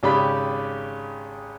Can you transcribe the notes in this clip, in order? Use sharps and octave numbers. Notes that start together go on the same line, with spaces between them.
G#1 C#3 G4 D5 B5